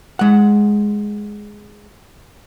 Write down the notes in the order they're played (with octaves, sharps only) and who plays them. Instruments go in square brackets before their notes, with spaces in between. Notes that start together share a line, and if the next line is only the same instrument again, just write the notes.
[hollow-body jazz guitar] G#3 F#5